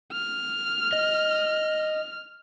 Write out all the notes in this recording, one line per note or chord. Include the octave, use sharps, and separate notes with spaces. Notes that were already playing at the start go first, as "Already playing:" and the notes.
F6
D#5